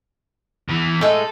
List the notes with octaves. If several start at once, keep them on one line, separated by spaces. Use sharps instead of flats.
E2 E3
A2 G#3 D#4 A4